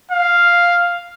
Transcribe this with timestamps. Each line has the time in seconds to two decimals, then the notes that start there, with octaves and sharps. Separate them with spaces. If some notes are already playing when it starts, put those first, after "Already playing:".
0.11 F5